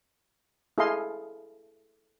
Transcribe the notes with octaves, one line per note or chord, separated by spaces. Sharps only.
E4 G#4 A4 D#5 F5 C6